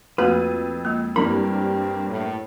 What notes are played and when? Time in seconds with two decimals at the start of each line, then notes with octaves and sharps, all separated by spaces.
0.18 F2 A3 A#3 F#4 B4 D#7
0.85 G#3 A#3
1.16 G2 G3 A#3 C4 E4 B5
2.09 A2